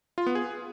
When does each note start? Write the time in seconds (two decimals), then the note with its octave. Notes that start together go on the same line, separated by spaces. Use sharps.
0.18 F4
0.26 B3
0.35 G#4